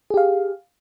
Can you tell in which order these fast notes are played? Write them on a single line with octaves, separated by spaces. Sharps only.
G#4 G4 F5